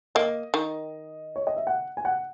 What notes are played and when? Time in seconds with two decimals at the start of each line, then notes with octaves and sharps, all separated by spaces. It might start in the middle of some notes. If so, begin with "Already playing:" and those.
0.15 A#3 D#5
0.54 D#3
1.36 C#5
1.47 D#5
1.57 E5
1.67 F#5
1.97 G#5
2.05 F#5